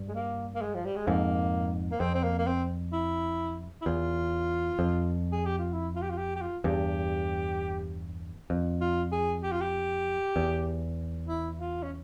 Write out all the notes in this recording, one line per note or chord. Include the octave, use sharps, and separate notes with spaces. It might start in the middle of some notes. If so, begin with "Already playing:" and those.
Already playing: G2
G#3
A#3
A#3
G#3
F3
G3
G#3
F2 G#2 A#3
A#3
F2 C4
C4
A#3
A#3
C4
E4
E4
E2 F4
F2
G#4
G4
F4
E4
F4
G4
F4
G4
G4
F4
E2 G2 G4
F2
F4
G#4
G4
F4
G4
E2
E4
F4
C#4